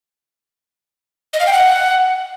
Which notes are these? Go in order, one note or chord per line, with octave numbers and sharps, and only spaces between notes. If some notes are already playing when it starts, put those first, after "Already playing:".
D#5
F5
G5
F#5